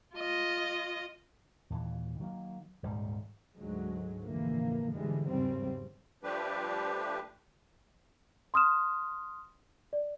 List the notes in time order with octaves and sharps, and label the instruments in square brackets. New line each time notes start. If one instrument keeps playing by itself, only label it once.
[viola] F4 D#5
[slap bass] D#2 A#2 E3
D#3 F#3 A3 A#3
D#1 D2 G#2 G3
[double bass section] D2 G#2 F#3 G#3
F1 A#1 A#2 D3 E3 A#3
G#2 B2 D3 E3 G3 G#3
G#1 E2 G2 C#3 G3 C4
[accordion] F3 G3 A3 D4 G4 B4
[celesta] C6 D#6 F6 E7
D5